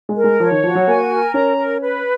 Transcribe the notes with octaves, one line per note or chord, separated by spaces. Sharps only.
G#3
A#4
G#3
F3 C#5
D#3
F3 F#4
F#3
A#3 G#5
A#4
C#4 A#5
A#4
B4